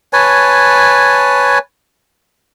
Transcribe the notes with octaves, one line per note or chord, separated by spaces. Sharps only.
B4 C#5 G#5 A5